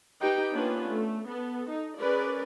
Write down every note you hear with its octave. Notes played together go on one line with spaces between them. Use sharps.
D#4 G4 B4 G5
A#3 B3 C#4 D4 F4 B4
A3
B3 A4
D#4
C#4 G#4 A#4 B4 D5